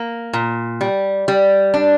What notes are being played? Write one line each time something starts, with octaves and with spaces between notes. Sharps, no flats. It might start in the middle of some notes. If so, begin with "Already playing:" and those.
Already playing: A#3
A#2
G3
G3
D4